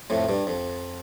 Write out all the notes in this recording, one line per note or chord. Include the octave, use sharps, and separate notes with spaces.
F2 A2
G2
F2